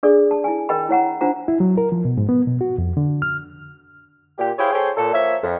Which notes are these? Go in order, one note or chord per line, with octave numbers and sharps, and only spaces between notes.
D4 G#4 A4 D5
A5
E4 G#5
A#4 D#5 G5 B5
E4 C#5 F#5 A#5
D4 F4 C5 F#5 A#5
E4
F#3
A#4
F3
B2
G#2
B3
B2
F#4
F2
D3
F6
A#2 G4
E4 G#4 C5 C#5 F5 G5
G#4 A4 C5 C#5 G5
A#2 A4
F3 A#3 C#5 E5
F2